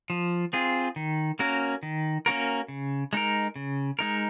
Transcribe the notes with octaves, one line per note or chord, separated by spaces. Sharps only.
F3
C4 F4 G#4
D#3
A#3 C#4 F#4 A#4
D#3
A#3 C#4 F#4 A#4
C#3
G#3 D#4 A#4
C#3
G#3 D#4 A#4